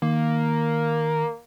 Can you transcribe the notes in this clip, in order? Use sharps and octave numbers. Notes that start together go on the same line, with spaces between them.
D#3 A#3